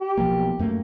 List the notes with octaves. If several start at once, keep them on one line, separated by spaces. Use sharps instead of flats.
G4
B1 F3 A#3
F#2 A3 A#3